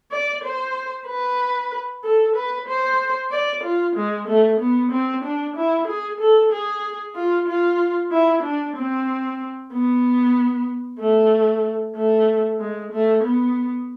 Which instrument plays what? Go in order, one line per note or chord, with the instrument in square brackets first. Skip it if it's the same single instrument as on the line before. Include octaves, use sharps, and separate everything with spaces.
[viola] D5
C5
B4
A4
B4
C5
D5
F4
G#3
A3
B3
C4
D4
E4
G#4
A4
G#4
F4
F4
E4
D4
C4
B3
A3
A3
G#3
A3
B3